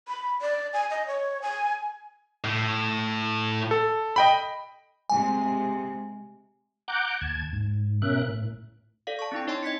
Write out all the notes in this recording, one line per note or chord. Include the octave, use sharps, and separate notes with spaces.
B5
D5
G#5
D#5
C#5
G#5
A2
A4
D#5 G5 B5
C3 G#3 G#5
F#5 A#5 D6 F#6 G6
D#2 A5 G#6
G#2
B2 C#4 A#4 E5 F#6
A2
A4 D5 F5
A5 C#6
C4 D4 E4 G5
D#4 C#5 D#5 A5 C6
D#5 G#6 B6 C#7